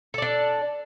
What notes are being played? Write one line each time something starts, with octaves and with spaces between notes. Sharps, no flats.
D4 A4 D5